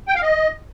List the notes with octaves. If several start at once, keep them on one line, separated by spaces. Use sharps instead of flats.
G5
F5
D#5